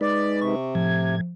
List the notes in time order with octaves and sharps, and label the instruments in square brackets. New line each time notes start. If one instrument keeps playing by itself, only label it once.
[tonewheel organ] G#3 D#4 B4 [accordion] D5
[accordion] C3 [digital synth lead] C#6
[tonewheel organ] A2 G#6 [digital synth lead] F3